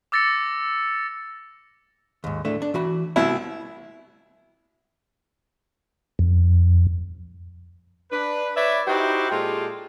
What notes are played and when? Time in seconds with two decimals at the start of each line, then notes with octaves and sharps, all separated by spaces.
0.12 D6 E6 A6 A#6 C#7
2.24 D#2 G#2
2.45 A2 A3 D4
2.62 D4
2.74 E3 F#4 B5
3.16 C2 A3 B3 E4 F#4
6.19 F2
8.12 D4 B4
8.56 B4 C#5 D5 E5
8.88 D#4 E4 F#4 G4 C5
9.31 A#2 G#3 F4 G4 A4